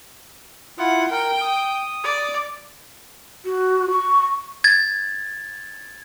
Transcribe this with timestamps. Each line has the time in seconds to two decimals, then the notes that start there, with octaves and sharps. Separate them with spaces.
0.78 E4 F4 F#5
1.11 A#4 G5
1.41 D#6
2.04 D5
3.45 F#4
3.91 C#6
4.64 G#6 A6